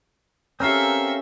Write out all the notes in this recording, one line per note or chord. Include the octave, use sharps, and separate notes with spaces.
C4 C#4 G4 A4 A#4 E5 F5